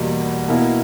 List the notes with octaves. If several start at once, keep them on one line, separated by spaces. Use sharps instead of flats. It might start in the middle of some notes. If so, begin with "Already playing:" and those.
Already playing: E2 B2 G3 A#3
B2 A#3 E4